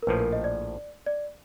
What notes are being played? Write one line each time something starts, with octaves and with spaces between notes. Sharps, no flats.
A#4
A#1 A2 F3 B4
A#4
D#5
D5
D5